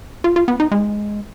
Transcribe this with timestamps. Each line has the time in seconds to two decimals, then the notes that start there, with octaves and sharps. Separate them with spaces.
0.24 F4
0.36 F4
0.48 B3
0.60 D#4
0.72 G#3